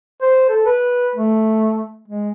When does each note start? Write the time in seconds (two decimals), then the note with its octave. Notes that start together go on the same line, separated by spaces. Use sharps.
0.21 C5
0.49 A4
0.66 B4
1.15 A3
2.08 G#3